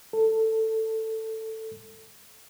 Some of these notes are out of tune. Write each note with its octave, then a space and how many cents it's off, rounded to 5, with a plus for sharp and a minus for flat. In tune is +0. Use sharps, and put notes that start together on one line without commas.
A4 +10